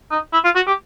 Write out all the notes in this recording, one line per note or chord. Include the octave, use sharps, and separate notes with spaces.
D#4
E4
F4
F#4
G4